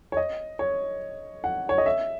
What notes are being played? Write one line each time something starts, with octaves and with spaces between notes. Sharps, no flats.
C#5
D#5
C#5
F#5
C#5
D#5
E5